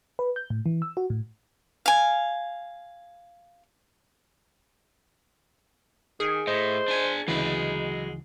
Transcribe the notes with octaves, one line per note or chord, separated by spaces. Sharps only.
B4
G6
A2
E3
E6
F#4
A2
F5 G#5
D#3 G#4
A2 C5 D#5
D4 G#5
D2 C#3 E3 F#3 G#3 B5